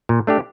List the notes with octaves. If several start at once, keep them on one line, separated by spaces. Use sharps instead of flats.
A#2
A3 D4 G4